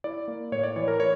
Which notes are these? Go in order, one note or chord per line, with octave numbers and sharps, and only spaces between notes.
E4 D5
A#3
A2 C#5
D5
E3 C#5
A#4
E4 C#5